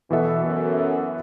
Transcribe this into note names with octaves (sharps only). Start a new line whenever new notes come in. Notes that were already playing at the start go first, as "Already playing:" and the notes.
B2 E3 B3 F#4 A4 E5
F#2